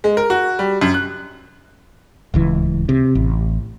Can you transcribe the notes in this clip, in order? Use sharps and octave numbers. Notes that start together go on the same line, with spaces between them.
G#3
A#4
F#4
G3
F#2
F#6
D1 C#2 E3
C3
A1